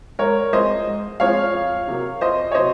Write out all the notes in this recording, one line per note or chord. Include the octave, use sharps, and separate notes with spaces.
G#2 A#4 C#5
F3 G#3 C4 C5 D#5
G#2
F3 G#3 C4 C#5 F5
F2
C3 F#3 A#3
F2 C5 D#5
C#5
C3 F#3 C5 D#5